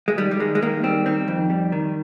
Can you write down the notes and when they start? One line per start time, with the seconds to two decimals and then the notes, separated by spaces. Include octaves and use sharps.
0.08 G#3
0.18 D#3 G3
0.31 G3
0.40 D#3 G#3
0.55 G#3
0.62 D#3 A#3
0.83 G3 C4
1.06 D#3 C4
1.28 F2
1.50 G3
1.72 D#3